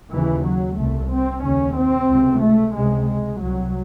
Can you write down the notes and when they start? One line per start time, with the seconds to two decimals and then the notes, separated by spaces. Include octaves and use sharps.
0.13 D#2 C#3 E3
0.46 F#3
0.78 C2 C3 A3
1.12 C4
1.45 D#2 C#3 C#4
1.77 C4
2.10 C#2 C3
2.43 A3
2.76 C#2 C3 G#3
3.08 G#3
3.41 C2 C3 F#3